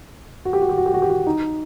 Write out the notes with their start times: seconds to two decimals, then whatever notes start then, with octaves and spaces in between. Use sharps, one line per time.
0.45 F#4
0.53 G4
0.62 F#4
0.69 G4
0.77 F#4
0.86 G4
0.94 F#4
1.02 G4
1.10 F#4
1.27 D#4